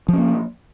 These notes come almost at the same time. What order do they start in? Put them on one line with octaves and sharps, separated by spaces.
F3 C#4 A#3